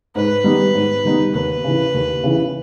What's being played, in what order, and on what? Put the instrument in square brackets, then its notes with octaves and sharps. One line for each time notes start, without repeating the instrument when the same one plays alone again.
[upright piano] G#2 [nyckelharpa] B4
[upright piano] D#3 G3 B3 D#4
G#2
D#3 G3 B3 D#4
[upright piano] D#2 [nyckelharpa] B4
[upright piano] C#3 E3
D#2
C#3 E3